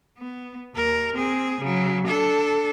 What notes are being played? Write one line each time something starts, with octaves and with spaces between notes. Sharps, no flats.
B3
D#2 A#4
C4 G#4
C#3 F#3
D4 A4